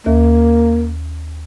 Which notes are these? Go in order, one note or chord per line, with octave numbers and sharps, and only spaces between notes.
D#2 A#3